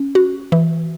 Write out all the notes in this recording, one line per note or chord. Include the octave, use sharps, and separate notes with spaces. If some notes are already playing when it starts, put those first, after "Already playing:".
Already playing: C#4
F#4
E3